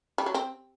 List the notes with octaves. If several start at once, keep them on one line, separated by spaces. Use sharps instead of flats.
G3
F#3
C4